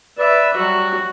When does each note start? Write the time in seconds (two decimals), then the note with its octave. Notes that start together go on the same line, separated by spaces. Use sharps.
0.18 B4 D5 E5
0.57 F#3 G3 F#4